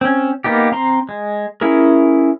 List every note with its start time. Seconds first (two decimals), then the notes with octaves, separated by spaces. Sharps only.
0.01 C4 C#4
0.44 A#3 B3 D#4 G4
0.72 C4 A#5 C6
1.09 G#3
1.61 C#4 E4 G#4 A#4